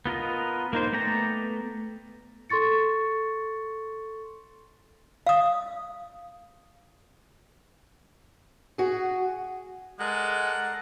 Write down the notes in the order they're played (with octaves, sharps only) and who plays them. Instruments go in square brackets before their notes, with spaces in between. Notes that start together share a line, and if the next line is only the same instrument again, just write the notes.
[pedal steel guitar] B3 F4 A#4 D#5
A#3 D#4 C5
A3 B3 D5 G5 A#5
[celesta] A4 C6 C#6 A6 C#7
[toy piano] F5 D#6
[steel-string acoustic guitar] F#4 G#4
[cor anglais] G#3 [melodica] A4 A#4 D5 [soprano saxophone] F#5